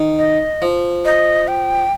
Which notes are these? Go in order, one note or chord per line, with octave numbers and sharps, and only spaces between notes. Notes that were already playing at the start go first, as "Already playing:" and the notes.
Already playing: D#3
D#5
F3
D#5
G5